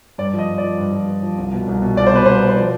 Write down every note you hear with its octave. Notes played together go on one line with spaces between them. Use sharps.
G2 D5
F3
D#5
G2
D5
F3
G2
F3
G2
F3
C2
B2
C2
B2
C2 D5
C5
B2 B4
C2 C5
B2
C5
F3 D5